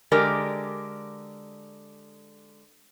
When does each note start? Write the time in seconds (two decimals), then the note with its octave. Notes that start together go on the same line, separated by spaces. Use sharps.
0.12 D3 G#3 G4 A#4 D5